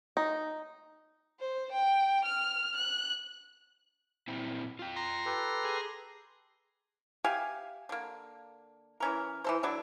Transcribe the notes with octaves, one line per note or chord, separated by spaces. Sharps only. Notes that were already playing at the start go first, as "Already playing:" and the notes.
D#4
C5
G5
F6
F#6
A#2 C4 E4
F4 G5
A#5 C6
G4 A4 B4
G#4
G4 E5 F5 G#5
D3 A#3
E3 C#4 A#4
E3 A4 C5
D3 F#3 D4 E4